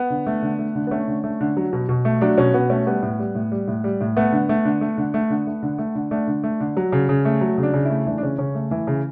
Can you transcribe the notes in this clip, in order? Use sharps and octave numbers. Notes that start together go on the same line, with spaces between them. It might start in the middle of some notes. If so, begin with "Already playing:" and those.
Already playing: B3
D3
A3
D3
A3
D3
B3
A3 C#4
D3
A3
D3
F#3
B2
B2
A3
F#3 D4
B2 C#4
B2 B3
A3 C#4
G3 B3
A2
G3
A2
G3
A2
G3
A2
A3 B3
D3
A3
D3
A3
D3
A3
D3
A3
D3
A3
D3
A3 D4
D3
A3
D3
F#3
C#3
C#3
A3
F#3
C#3
D4
C#3
E4
A3
E3 D4
D4
C#3 C#4
C#3 C#4
A3
E3
C#3